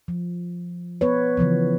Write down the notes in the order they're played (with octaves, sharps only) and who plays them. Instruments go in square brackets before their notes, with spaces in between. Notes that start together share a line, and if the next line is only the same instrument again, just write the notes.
[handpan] F3
B3 B4 C#5
C#3 E3 F3 B3